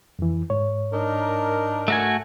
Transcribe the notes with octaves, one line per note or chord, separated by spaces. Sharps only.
F2 E3
G#2 C#5
D4 D#4 A#4
A3 F#4 G#5